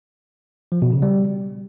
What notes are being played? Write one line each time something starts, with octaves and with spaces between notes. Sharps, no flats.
F3
B2
C#3
G3